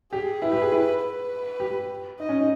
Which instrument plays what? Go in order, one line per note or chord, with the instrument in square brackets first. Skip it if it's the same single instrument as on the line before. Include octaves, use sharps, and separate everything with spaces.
[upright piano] G4 [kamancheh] G#4
[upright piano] E4 [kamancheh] B4
[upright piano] G4
G#4
E4
[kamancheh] B4
[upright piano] G4
[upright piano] D#4 [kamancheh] D#5
[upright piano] C#4
D#4